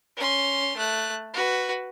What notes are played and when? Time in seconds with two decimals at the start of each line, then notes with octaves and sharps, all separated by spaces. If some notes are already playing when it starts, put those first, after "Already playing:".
0.17 C#4 C6
0.77 A3 F#6
1.34 F#4 B4